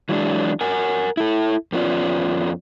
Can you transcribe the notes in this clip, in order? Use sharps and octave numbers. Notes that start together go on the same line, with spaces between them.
E3 F#3 G#3 D4
A#4 F#5 G#5
E4 A4
F2 B3 C#4 F4 D5